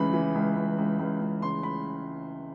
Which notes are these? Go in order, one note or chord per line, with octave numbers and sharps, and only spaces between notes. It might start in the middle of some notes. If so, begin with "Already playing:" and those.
Already playing: C#2 C#3 E3 B5
E3
C#2
C#2
C#2
C#2
C#2
C#3 C6
B5